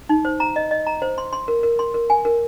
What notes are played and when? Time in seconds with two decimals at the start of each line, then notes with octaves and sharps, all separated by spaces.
0.09 D#4
0.25 C5
0.40 A#5
0.56 D#5
0.71 D#5
0.87 A#5
1.02 C5
1.18 C6
1.33 C6
1.48 A#4
1.63 A#4
1.79 C6
1.94 A#4
2.10 G#5
2.25 A#4